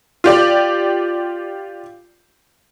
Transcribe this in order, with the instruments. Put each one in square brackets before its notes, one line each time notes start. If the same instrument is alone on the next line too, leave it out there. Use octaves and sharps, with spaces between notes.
[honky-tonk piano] F4 G4 D5